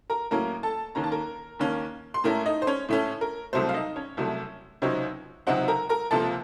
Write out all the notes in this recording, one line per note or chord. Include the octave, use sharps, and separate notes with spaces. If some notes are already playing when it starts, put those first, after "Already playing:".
A#4 A#5
A2 F#3 A#3 C#4 A#4 A#5
A4 A5
D#2 D#3 A#3 C#4 A#5
A5
A#4 A#5
D#2 D#3 A#3 C#4
C6
A2 A3 C#4 A#4 A#5
D#4 D#5
C5
C#4 C#5
A2 A3 C#4
A#4
C2 C3 F#3 A3 C5
F5
D#4 D#5
C#4 C#5
C2 C3 F#3 A3
C#2 C3 F#3 C4 C#4 D#4 C#5
C#2 C3 F#3 C4 D#4 F#4 F#5
A#4 A#5
A#4 A#5
C#2 C3 F3 A#3 A4 A5